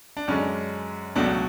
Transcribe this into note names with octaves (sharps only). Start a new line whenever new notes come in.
D4
F#2 D3 G#3 C#4
C#2 B2 F#3 A3 D4